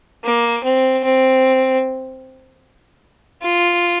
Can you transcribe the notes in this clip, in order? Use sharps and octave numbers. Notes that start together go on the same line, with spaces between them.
A#3
C4
C4
F4